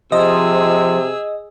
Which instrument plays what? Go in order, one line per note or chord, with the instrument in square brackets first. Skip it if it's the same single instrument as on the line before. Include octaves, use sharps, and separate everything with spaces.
[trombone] C3 [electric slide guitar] F3 [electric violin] G#4 E6 [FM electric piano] D#5